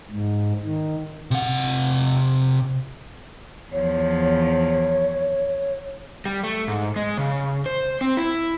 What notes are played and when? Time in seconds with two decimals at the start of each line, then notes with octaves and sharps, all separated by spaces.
0.11 G#2
0.63 D#3
1.31 C3 F#5
3.72 E2 F3 C#5
6.25 G3
6.43 A3
6.68 G#2
6.96 G#3
7.18 C#3
7.66 C5
8.01 C4
8.17 E4